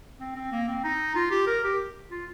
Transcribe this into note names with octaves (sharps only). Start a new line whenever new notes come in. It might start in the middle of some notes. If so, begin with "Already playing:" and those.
C4
C4
A#3
C4
D#4
F4
G4
A#4
G4
F4